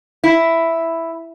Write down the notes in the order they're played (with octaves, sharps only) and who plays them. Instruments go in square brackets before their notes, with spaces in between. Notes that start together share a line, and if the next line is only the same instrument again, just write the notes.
[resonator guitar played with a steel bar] E4